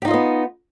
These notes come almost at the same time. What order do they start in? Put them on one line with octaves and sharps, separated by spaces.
G4 D#4 F4 D#5 B3